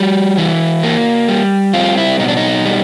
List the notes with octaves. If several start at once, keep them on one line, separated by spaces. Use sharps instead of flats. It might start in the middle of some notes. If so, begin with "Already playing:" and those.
Already playing: G3 F#4
E3
A#3
G3
C4 F4
E4
B2 D#4
D4
D#4
G3